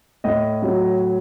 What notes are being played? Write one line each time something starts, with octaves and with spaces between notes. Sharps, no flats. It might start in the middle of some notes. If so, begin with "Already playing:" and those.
A2 D#5
F#3